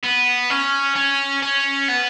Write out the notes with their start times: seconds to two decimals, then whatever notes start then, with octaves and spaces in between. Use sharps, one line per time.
0.04 B3
0.50 C#4
0.96 C#4
1.43 C#4
1.88 B3